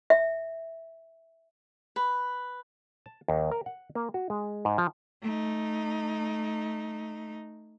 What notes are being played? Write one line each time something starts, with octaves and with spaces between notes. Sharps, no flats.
E5
B4
A5
D#2
A#4
F#5
A#3
F#4
G#3
G#2
F3
A3 D#4